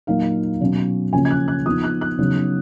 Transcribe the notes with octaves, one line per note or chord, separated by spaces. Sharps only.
A#2 F#3 A#3 D#4 F5
B2 F#3 C#4
C#3 F3 A#3 C#4 G#5
G#6
F#6
F#6
F3 B3 D#4 D#6
F#6
F#6
C#3 F#3 B3 D#4